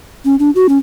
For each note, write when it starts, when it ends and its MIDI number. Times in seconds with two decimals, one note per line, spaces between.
0.25 0.35 61
0.39 0.50 62
0.55 0.67 66
0.69 0.78 61